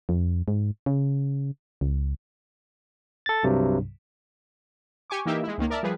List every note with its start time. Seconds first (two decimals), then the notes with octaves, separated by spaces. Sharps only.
0.09 F2
0.48 G#2
0.86 C#3
1.81 C#2
3.26 A4 A6
3.43 C2 G2 C3 F#3
5.10 G4 G#5 C#6 D6
5.26 E3 A#3 D#4 G4 E5
5.43 G#3 E4
5.58 C#2 D#3 A#3
5.70 A#4 D5 E5 A5
5.83 F3 G3 G#4 B4